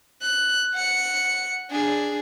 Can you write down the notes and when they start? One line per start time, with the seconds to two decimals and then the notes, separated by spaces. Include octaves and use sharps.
0.22 F#6
0.75 F#5 C#7
1.71 D4 G#4